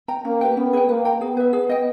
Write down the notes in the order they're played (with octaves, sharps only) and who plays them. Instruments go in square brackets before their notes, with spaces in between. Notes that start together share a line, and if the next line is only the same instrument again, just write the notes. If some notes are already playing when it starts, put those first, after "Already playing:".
[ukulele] G5 A#5
[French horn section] A#3 [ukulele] C#4
[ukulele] G4 B4 G5
[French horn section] B3 [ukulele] C#4
[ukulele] G#4 B4 G5
[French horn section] A#3 [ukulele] B4
[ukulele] G5 A#5
[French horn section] B3 [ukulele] G#4
[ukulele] B4 E5
G#4
D#5 G5